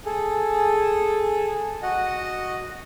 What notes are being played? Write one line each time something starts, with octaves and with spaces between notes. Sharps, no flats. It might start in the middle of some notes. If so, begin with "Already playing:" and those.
G#4 A4
F#4 D#5 F#5